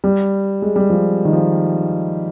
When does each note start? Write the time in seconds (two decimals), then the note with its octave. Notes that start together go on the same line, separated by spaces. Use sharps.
0.04 G3
0.62 G#3
0.76 G3
0.90 F3
1.25 D#3
1.33 F3